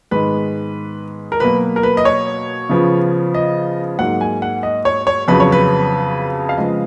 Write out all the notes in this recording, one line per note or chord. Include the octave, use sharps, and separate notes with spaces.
G#2 D#3 G#3 B3 B4
A#4
B2 F#3 A#3 B4
A#4
B4
D#5
C#5
C#3 F3 B3
D#5
G#2 F#3 A#3 F#5
G#5
F#5
D#5
C#5
C#5
F2 C#3 F#3 B3 B4
C#5
B4
F5
C#3 F3 G#3 B3 D#5